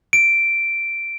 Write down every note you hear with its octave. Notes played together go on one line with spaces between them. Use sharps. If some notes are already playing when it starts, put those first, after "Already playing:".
D7